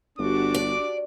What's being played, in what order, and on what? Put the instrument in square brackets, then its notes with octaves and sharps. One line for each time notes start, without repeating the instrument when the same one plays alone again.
[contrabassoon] G1 [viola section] D4 F#4 G4 [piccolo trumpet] D6
[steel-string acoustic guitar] D5